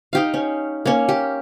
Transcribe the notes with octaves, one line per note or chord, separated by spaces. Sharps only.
D#4 G4 F5
C#4
A#3 C#4
G4